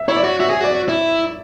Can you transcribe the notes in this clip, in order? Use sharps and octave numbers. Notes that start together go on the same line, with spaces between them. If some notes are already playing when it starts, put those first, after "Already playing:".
Already playing: E5
E4 C#5
D5
F#4
F#4 E5
G#4
F#4 D5
E4